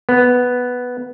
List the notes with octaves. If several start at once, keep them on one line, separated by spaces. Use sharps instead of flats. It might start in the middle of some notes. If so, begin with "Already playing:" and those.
B3